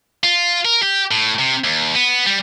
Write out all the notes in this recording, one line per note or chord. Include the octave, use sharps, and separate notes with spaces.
F4
A#4
G4
A2
C3
D#2
B3
G3